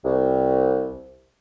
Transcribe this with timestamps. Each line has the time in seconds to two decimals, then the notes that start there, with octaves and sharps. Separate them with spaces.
0.04 C2